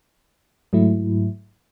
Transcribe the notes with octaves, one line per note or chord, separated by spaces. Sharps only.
G#2 F#3 A3 E4